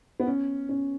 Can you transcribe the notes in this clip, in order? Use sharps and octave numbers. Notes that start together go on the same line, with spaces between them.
B3
C#4
C#4